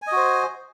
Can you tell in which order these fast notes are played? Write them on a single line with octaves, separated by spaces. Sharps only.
G#5 D#5 F#4 C5